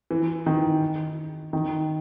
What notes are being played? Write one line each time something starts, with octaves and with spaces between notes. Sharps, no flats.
E3
D#3
D#3